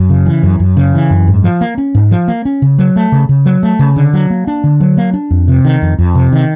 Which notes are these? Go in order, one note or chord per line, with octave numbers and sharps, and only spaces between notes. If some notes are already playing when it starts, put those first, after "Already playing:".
Already playing: F#2
C#3
E3
F#2
F#2
C#3
E3
F#2
G#2
F3
A#3
C#4
G#2
F3
A#3
C#4
C#3
F#3
A3
C#3
C#3
F#3
A3
C#3
D3
F#3
A#3
D4
D3
F#3
A#3
D4
F2
C3
D#3
F2
F2
C3
D#3